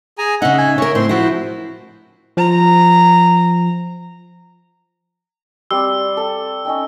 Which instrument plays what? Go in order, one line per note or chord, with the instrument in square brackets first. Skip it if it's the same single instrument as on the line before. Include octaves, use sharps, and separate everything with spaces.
[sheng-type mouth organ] G#4 G#5 A#5
[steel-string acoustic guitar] C#3 D#4 [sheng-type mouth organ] E5 [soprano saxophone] F#5
[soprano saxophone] G#5
[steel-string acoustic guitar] C#3 A#4 [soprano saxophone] C#5
[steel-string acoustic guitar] A2 [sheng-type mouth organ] C4 C6 [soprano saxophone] C5
[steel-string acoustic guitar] F3 E4 [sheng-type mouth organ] F#4
[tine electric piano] F3 [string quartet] A#5
[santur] G3 C4 D5 [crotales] E6
[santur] A4
C#4 D#4 G5